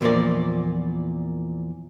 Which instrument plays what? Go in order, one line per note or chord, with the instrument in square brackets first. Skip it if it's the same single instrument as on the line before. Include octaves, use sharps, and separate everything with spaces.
[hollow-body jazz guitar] E2 A#2 F3 A#4 D5